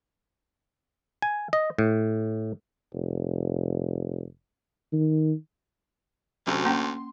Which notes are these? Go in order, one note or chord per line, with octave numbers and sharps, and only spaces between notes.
G#5
D#5
A2
F1
D#3
D2 C3 F#3 C#4
A#3 C#4 G5 C6